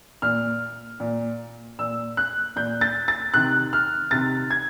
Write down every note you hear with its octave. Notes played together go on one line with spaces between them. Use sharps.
A#2 F6
A#2
A#2 E6
F#6
A#2 G6
A6
A6
C3 D#3 F#6
F6
C3 D#3 A6
G#6